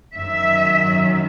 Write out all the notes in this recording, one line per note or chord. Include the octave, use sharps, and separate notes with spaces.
F#2 D#3 F#3 E5